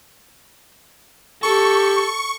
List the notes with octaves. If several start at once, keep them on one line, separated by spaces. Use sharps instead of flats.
G4 A4 C#6